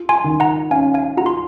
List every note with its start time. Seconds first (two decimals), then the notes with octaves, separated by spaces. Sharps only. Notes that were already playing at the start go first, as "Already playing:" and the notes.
Already playing: F4
0.09 G#5 C6
0.24 D#3
0.40 F#5 A#5
0.71 C#4 F5 G#5
0.94 F5 G#5
1.17 F4 F#5 A#5
1.26 C6